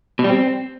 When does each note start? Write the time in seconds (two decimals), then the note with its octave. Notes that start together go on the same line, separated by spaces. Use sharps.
0.19 B2
0.24 G3
0.30 C4